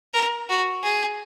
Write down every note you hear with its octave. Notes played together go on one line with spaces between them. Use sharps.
A#4
F#4
G#4